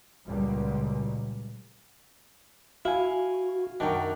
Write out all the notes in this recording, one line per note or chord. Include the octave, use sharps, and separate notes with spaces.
C#2 A#2 F#3 G3
E4 F#4 F5 G#5
F#2 D#3 D4 F#4 G5 A#5